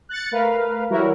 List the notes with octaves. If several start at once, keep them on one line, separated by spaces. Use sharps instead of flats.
F#6 A6 C#7
A3 A#4 B4 F5
E3 F#3 G3 E4 F#4 A#4